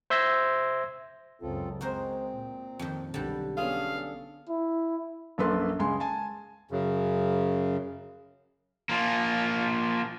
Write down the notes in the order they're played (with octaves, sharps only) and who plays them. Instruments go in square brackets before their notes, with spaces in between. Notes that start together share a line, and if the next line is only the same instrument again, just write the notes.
[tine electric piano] C5 E5 C6 E6 G#6 A#6
[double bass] C#2 F#2 [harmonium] C4 F4 A4
[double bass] G#3 [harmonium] C4 [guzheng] F#4 A#4 C5
[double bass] A#2
[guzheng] F2 D#3
[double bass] B1 [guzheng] D3 G3
[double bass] B3 C#4 [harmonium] D4 A4 [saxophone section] G#4 F5
[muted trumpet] E4
[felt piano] A#1 F#2 A#3 A4 B4 C6
C#2 G#3 G#4 C6
G#5 A5
[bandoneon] F#2 C#3
[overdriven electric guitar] F3 A#3